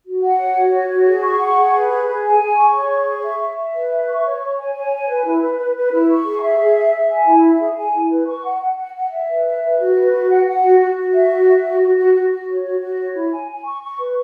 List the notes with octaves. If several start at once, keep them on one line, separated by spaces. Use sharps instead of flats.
F#4
F#5
C#5
F#4
C#5
F#4
G#4
C#6
F#5
G#4
B4
G#4
G#4
G#5
G#4
C#6
C#5
G#4
C#6
E5
E5
E5
B4
E5
C#6
C#5
C#5
G#5
C#5
G#5
B4
E4
B4
B4
B4
E4
C#6
G#4
E5
G#4
E5
E5
G#5
E4
E5
G#4
G#5
E4
B4
C#6
F#5
F#5
F#5
F#5
E5
B4
E5
B4
F#4
B4
F#4
F#5
F#5
F#4
F#4
F#4
E5
F#4
E5
F#4
F#4
F#4
F#4
F#4
C#5
F#4
F#4
C#5
E4
G#5
G#5
C#6
C#6
B4